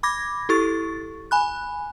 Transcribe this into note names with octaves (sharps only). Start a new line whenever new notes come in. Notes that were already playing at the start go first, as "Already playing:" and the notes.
B5 D6 G#6 A#6
E4 G4 A4 C#6 A6
G#5 B5 F#6